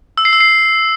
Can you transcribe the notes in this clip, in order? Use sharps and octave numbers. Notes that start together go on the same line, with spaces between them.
E6
C7
E6
C7